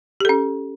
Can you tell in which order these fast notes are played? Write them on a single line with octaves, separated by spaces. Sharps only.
G4 A4 C#4